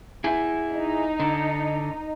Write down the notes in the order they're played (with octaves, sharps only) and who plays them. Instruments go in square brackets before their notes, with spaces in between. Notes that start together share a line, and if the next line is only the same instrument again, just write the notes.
[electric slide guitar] E4 G#4
[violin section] D#4
[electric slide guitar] D3